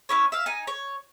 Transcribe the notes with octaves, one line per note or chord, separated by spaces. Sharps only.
C#4 E4 C#5
E5 F5
D#4 G#5
C#5